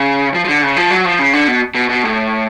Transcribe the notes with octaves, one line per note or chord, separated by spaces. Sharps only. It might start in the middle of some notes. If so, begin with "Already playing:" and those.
Already playing: C#3
F3
F3
D3
C#3
F3
F#3
F3
C#3
D3
B2
B2
B2
A2